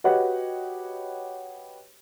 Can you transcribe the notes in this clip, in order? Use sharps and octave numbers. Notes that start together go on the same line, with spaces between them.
F#4 G4 B4 C#5 D#5 F#5